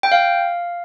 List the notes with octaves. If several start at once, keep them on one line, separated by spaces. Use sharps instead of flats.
G5
F5